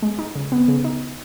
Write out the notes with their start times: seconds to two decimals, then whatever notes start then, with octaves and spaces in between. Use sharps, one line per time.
0.02 G#3
0.19 D#4
0.35 C#3
0.52 B3
0.68 C#3
0.84 D#4